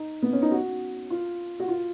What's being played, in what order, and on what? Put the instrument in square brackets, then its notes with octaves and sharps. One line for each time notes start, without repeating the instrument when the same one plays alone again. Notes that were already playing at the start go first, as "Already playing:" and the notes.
Already playing: [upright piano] D#4
B3
C#4
D#4
F#4
F4
F#4
F4